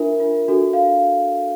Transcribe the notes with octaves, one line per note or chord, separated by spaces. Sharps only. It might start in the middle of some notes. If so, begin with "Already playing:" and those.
Already playing: D4 F4 A#4 E5
D4 F4 A#4
D4 F#4 A4
F5